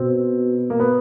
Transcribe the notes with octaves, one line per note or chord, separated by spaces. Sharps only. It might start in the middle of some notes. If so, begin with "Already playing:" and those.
Already playing: B2 C4
A#3
B3